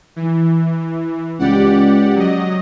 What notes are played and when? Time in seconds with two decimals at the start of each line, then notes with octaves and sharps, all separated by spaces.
0.16 E3
1.39 C#2 G4 D5 F#5
2.15 F#3 D#5